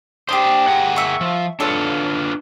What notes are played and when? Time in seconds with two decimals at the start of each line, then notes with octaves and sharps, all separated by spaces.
0.29 D4 G4 C5 D#6
0.68 G#4 A#4 F#5
0.96 E5 C#6
1.21 F3
1.60 D4 F4 A4 B4 C#5